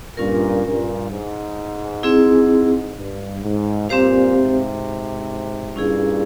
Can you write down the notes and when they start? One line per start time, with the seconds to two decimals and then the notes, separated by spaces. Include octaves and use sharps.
0.17 G2 A#2 C#4 F4 A#4
0.64 G2 A#2
1.11 G#2
2.03 C4 E4 G#4
2.97 G2
3.43 G#2
3.89 G2 A#2 C4 G4 C5 F5
4.35 G#2 C3
5.75 G2 A#2 C#4 E4 G#4